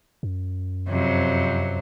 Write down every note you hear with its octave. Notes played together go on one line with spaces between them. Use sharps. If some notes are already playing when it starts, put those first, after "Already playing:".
F#2
F2 C3 F#3